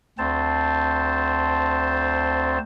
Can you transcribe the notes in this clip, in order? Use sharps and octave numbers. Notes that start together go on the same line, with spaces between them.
D2 C4 C5 A5